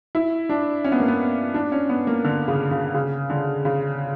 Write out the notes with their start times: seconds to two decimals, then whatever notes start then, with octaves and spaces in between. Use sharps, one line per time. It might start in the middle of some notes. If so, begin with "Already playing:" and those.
0.15 E4
0.49 D4
0.84 C#4
0.92 B3
1.00 A#3
1.08 B3
1.54 D4
1.72 C#4
1.89 B3
2.07 A#3
2.24 D3
2.48 C#3
2.71 C#3
2.94 C#3
3.30 D3
3.65 C#3